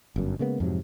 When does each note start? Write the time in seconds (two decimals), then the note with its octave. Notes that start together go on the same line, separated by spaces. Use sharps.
0.16 G1 F#2
0.39 C#3 G#3 A#3 B3
0.60 F2 G#2 C3 F#3